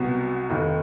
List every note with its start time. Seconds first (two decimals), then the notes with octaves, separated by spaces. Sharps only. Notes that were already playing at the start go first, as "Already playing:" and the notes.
Already playing: C2 B2 F#3 B3
0.50 F1 D#2 D#3